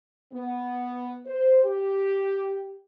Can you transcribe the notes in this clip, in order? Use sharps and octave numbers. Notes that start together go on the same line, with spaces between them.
B3
C5
G4